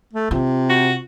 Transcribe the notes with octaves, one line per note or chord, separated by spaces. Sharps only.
A3
C3 F4
F#4